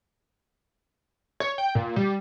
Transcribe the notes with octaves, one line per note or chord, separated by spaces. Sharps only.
C#5
G5
A#2
G3